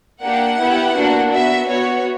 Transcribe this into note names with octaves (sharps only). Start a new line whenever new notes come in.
A#3 D4 G4 F#5
B3 E4 G4
A#3 D4 F#4
B3 F#4 E5
B3 F#4 C#5